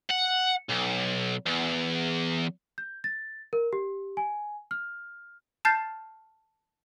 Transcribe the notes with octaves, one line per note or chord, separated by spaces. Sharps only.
F#5
B1
E2
G6
A6
A#4
G4
G#5
F6
A5 F6 G6 A6 C7